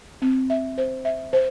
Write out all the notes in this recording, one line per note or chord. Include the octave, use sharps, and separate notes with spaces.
C4
E5
C5
E5
C5